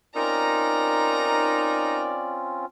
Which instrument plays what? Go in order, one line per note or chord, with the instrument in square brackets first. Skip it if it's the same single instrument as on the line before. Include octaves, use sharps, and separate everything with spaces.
[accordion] C4 C#4 F4 [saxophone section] D#4 A#4 [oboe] D5 [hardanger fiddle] A#5